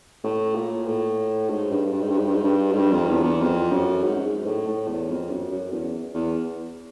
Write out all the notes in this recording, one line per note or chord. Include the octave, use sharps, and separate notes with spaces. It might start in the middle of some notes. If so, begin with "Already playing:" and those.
A2
A#2
A2
G#2
G2
G2
G#2
G2
G#2
G2
G#2
G2
G#2
G2
F2
E2
E2
F2
F#2
G#2
G#2
A2
A2
E2
F2
F#2
F#2
E2
E2